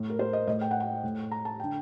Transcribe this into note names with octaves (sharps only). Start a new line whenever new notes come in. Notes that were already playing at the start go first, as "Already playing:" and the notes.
Already playing: A2
A#4
C5
D#5
A2 D#5
G5
F#5
G5
A2
A#5
A5
D3 G5